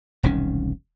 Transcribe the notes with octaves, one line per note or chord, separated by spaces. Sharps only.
E1 C2 D#3 C#4